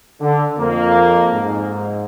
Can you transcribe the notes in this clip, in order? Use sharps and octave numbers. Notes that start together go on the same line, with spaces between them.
D3
F2 A#3
G#2